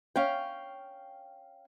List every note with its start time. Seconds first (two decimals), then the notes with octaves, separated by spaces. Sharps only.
0.16 C#4 F5 G5